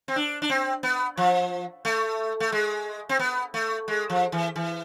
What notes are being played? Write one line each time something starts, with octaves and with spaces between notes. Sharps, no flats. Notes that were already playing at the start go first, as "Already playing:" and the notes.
C4
D4
D4
C4
B3
F3
A3
A3
G#3
C4
B3
A3
G#3
F3
E3
E3